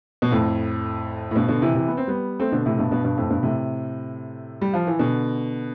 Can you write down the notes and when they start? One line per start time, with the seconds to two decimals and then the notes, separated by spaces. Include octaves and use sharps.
0.22 B2
0.31 F2 A2
1.31 A2
1.35 G2 B2
1.48 B2 D3
1.62 C3 E3
1.75 C3 E3
1.88 B3
1.97 C4
2.07 G3 B3
2.40 A3 C4
2.52 B2 D3
2.66 A2 C3
2.78 G2 B2
2.91 G2 B2
3.04 G2 B2
3.17 F2 A2
3.30 G2 B2
3.43 A2 C3
4.61 G3
4.74 F3
4.87 E3
4.99 B2 D3